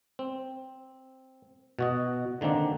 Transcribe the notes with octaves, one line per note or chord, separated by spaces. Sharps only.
C4
B2 F#4 D#5
D3 D#3 A#3 C4 D4